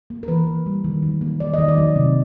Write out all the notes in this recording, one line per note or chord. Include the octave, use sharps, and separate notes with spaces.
A#3
A#4
E3 B4
E3
G3
D#3
F#3
A#3
D#3 D5
D#3 D#5
D5
F#3
C3